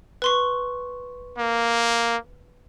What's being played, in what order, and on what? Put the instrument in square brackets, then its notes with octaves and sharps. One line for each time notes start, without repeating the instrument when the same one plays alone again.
[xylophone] B4 C6 C#6
[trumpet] A#3